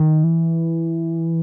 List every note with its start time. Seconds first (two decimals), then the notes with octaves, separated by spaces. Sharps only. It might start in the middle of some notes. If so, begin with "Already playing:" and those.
Already playing: D#3
0.24 E3